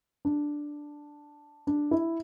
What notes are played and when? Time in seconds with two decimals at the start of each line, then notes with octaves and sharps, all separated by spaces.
0.25 D4
1.67 D4
1.91 E4